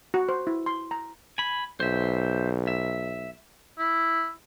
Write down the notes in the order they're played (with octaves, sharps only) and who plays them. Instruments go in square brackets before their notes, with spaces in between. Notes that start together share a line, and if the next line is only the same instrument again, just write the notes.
[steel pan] F#4
C5
E4
C6
A#5
[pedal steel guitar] G#5 B5
[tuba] B1 [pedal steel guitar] C5 E5
[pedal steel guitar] E5
[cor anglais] E4